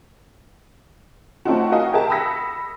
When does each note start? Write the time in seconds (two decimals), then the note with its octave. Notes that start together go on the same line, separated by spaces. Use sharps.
1.45 A3 C4 C#4 D#4 F4 F#4
1.72 F#4 A#4 D#5 F5 G#5
1.93 G4 G#4 A#4 E5 A5
2.10 B5 D#6 E6 A#6 B6 C#7